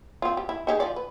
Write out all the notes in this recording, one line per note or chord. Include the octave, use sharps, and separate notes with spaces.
C4 F4
G4
E4
D#4 G4 G#4
F3 D5
B4